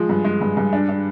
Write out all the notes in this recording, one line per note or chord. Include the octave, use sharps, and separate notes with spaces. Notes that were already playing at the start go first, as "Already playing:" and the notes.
Already playing: F3 G#3
G2
G#3
G2
G2
D4
D4